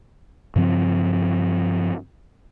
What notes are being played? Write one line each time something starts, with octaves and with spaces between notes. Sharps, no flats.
G2 C#3 F3 C4